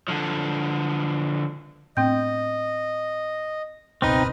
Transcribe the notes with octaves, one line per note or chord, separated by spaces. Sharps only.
D3 F3
A2 B3 C4 D4 D#5 G5 G6
G1 C#2 B2 C4 D#4 B4 D#6 F6